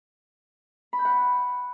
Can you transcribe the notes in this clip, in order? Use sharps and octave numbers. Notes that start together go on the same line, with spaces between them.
B5
G6
F#5